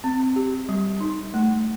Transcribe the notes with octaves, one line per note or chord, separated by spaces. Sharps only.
C4
G4
G3
D#4
A3